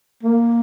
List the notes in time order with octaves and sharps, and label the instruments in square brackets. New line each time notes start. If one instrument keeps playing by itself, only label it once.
[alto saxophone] A#3